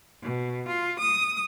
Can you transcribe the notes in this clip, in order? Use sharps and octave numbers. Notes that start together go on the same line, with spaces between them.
B2
F4
D#6